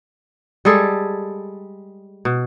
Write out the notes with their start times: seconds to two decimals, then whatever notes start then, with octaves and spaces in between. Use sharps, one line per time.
0.65 G3 G#3 G#4 A4
2.25 B2